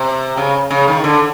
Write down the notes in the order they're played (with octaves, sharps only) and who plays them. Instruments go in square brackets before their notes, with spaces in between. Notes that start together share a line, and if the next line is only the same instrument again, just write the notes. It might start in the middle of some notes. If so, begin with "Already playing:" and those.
Already playing: [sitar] C3
C#3
C#3
D#3
D3